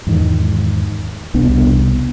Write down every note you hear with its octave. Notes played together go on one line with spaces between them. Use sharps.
E2 G#2 D#3
E1 C2 B3 D4